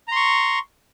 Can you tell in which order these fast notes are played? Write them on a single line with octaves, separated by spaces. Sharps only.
A#5 C6 C#6